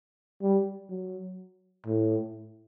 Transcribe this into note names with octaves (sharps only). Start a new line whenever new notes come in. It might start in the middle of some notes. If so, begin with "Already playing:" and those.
G3
F#3
A2